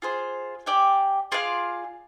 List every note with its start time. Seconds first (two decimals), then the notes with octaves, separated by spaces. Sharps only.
0.02 F4 G#4 C5
0.66 G4 D5 G#5
1.32 F4 G#4 D5 F5